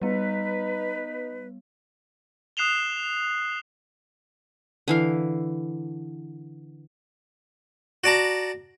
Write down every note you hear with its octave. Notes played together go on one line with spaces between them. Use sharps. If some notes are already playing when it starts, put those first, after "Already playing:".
G3 B3 D#4 B4
D#6 F#6 C7 E7 F7 G7
D3 E3 F5
F#4 D5 A5 A#5